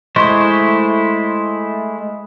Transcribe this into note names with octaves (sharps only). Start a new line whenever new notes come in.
G#3 A3 E4 C5 C#6